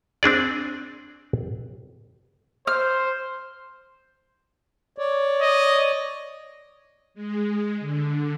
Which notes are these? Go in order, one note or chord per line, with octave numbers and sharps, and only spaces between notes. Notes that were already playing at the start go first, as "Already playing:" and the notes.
C4 D4 G#4 D5
C5 F6
C#5 D5
D#5
G#3
D3